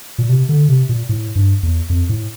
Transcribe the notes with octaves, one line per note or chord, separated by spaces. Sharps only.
A#2
C3
D3
C3
A#2
A2
G2
E2
F2
A2